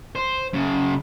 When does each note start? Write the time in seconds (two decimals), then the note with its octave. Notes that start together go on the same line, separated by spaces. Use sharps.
0.15 C5
0.53 F#2 C#3